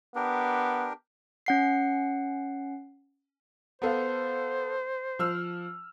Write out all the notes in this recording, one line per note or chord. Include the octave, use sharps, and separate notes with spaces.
B3 D4 G4 A#4
C#4 F#5 C7
B3 A4 C5 F5
F3 E6 F6